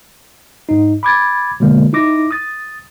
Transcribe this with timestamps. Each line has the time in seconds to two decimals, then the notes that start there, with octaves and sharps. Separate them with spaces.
0.69 G#2 D#4
1.03 B5 D6 G#6 A6
1.60 B2 D3 F3 G#3 A#3
1.93 D#4 E4 D6 A#6
2.31 D#6 A6